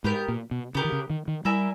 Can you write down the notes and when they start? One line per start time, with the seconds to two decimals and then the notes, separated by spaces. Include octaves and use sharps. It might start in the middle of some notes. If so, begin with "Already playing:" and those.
0.04 G#2 B3 G4 A#4
0.28 A#2
0.51 B2
0.75 C#3 B3 G4 A#4
0.85 D#3
0.92 C#3
1.10 D#3
1.28 D#3
1.45 G3 E4 A#4 E5 G#5